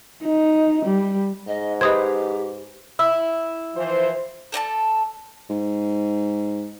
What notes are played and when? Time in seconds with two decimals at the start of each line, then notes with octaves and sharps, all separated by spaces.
0.23 D#4
0.86 G3
1.47 G#2 D#5
1.81 G4 B4 C5 D#5 D#6 G#6
2.99 E4 E6
3.75 E3 F3 C5
4.52 A4 D5 D#5 A5
5.50 G#2